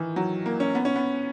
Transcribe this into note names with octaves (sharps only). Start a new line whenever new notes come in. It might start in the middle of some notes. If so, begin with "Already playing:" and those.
Already playing: D#3 E3
F#3
A#3
C#4
B3
C#4
B3